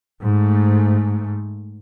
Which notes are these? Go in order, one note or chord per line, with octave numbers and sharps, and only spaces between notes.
G#2 A3